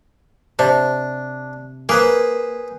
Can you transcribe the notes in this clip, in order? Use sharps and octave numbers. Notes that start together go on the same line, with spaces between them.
C3 D4
A#3 G#4 B4 C5